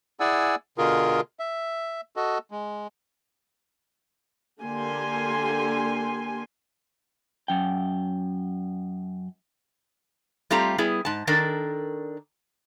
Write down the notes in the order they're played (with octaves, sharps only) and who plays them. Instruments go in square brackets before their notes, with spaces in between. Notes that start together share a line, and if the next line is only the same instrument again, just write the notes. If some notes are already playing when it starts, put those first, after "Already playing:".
[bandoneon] E4 G#4 D5 F#5 G#5 E6
B2 D3 F4 G#4 A#4
E5
F#4 A4 D#5
G#3
[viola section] D3 A#3 G4 G#5 C6
[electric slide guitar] F#2 G5
[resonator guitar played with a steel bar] G3 A3 C4 F4 G4 A#5
G3 B3 E4 G#4
G#2 A5
D#3 D4 A4 A#4